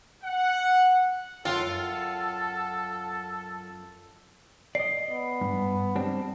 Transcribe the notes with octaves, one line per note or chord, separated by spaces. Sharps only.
F#5
F#2 F4 A4 F#5 G5
D5 D#5 C7
B3
G2
G3 C4 D4